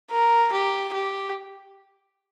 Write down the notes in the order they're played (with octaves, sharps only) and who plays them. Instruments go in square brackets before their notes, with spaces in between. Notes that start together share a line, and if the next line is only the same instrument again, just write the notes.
[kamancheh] A#4
G4
G4